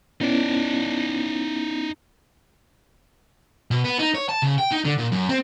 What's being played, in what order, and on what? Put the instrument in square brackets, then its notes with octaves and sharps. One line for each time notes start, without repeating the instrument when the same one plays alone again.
[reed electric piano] B3 C#4 E4 [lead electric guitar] D#4 D5
[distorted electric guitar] B2
B3
D#4
C#5
A5
C#3
G5
D#4
D3
A#2
F#2
C4